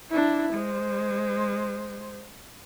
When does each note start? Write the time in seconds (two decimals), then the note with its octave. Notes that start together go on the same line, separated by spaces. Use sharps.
0.11 D4 E4
0.53 G#3 C5